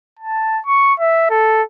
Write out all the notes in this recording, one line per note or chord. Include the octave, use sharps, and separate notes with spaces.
A5
C#6
E5
A4